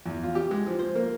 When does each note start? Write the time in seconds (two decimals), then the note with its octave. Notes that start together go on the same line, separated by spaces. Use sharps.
0.06 E2
0.23 F4
0.35 G4
0.51 G#3
0.66 F3
0.79 C5
0.95 A#3